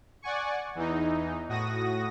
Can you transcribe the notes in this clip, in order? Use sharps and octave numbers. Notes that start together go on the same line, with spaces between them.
D5 F#5 G#5 C#6
E2 E3 D#4
A2 F#4 D#6 A#6